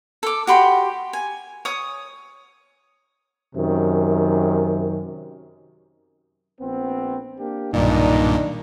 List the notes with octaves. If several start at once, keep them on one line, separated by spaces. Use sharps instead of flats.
A4 D6
F#4 G4 B5 C6
G#5
C#5 D#6
F#2 C3 D#3
A#1 B3 C4
A#3 D4 G4
B1 G2 A#2 D#3 D4 D#4